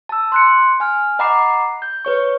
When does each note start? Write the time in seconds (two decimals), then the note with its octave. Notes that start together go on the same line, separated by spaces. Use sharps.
0.09 A5 E6
0.32 C6 F#6 C#7
0.80 G#5 F6
1.19 D#5 F#5 A#5 B5 D6 C7
1.82 G6
2.05 B4 C#5 C#6